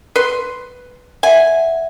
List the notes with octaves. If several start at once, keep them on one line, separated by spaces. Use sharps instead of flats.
B4 C6
E5 F#5 G#5